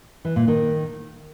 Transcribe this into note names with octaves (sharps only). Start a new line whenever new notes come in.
E3
A#2
D#3